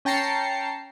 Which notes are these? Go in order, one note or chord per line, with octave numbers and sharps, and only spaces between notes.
C#4 G5 A5 A#5 C7 C#7